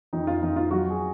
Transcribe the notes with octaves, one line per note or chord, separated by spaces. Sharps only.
F2 D#4
F4
F2 D#4
F4
F#3 F#4
G#4